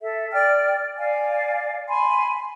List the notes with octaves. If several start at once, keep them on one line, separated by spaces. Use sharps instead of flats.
A4 E5
D5 G5 F6
D5 F5 G#5
G#5 B5 C6